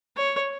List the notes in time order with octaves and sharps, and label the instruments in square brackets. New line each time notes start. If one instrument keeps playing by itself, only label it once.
[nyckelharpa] C#5